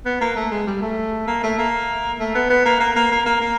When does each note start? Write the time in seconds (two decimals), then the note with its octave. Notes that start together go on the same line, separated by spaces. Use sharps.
0.05 B3
0.21 A#3
0.36 A3
0.51 G#3
0.67 G3
0.82 A3
1.27 A#3
1.43 A3
1.58 A#3
2.19 A3
2.35 B3
2.50 B3
2.65 A#3
2.80 A#3
2.96 A#3
3.11 A#3
3.26 A#3
3.41 A#3